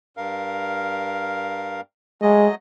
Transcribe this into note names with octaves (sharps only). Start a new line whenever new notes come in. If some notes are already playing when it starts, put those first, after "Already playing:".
G2 A#4 F5
F#3 G#3 A3 D#5